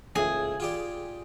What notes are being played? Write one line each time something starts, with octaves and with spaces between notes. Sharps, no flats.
C#2 A2 G#4
F4 G4 D5